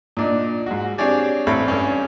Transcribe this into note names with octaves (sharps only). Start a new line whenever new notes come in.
A#2 D4 D#4
G#2 F#4
C4 D4 G4 G#4 C#5 D5
A1 C4 A4 C#5 B5
G2 C#4 D5